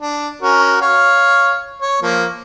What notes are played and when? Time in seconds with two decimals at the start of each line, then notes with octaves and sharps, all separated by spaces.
0.01 D4
0.42 C#4 F#4 A#4
0.81 C#5 F5
1.82 C#5
2.02 F3 A#3